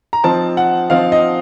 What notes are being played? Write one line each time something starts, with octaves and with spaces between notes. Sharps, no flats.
A#5
F3 C4 D#4 A5
F#5
F3 C4 D#4 F5
D#5